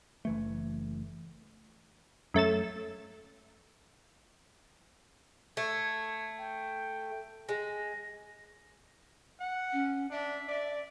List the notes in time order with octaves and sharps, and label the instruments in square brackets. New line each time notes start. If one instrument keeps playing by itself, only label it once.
[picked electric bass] F#1 E3 A3
[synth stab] F#2 A3 A6 E7
[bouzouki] A3 [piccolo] G#6
[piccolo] G5
[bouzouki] G#3 [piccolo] A#6
[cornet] F#5
[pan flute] C#4
[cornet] D4 [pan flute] E5
[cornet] D5